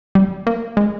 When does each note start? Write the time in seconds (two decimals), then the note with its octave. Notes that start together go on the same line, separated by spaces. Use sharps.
0.15 G3
0.47 A#3
0.77 G#3